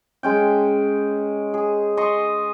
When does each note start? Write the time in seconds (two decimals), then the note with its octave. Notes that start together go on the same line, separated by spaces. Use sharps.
0.23 G#3 C#4 G5
1.54 G#4
1.97 D#5 C6 C#6